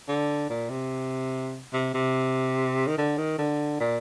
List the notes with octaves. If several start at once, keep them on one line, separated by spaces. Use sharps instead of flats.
D3
A#2
C3
C3
C3
D#3
D3
D#3
D3
A#2